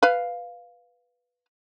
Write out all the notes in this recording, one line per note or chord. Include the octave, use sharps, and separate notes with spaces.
B4 F5